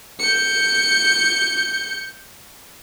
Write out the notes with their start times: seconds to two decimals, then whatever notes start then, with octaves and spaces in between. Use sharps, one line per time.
0.20 G6 C#7